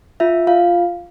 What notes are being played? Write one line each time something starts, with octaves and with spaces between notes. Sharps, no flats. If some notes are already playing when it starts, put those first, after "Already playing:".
F4 E5
F4 F5